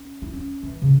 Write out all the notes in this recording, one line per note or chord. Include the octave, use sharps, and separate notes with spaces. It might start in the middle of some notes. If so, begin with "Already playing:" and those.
Already playing: C#4
E4
C#4
E3
C#3